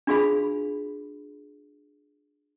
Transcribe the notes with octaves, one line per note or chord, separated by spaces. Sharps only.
D4 F4 F#4 G#4 F5 B5